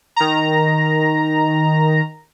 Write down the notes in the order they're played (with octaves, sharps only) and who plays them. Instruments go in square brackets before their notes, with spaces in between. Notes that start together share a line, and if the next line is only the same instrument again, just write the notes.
[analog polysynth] D#3 A#5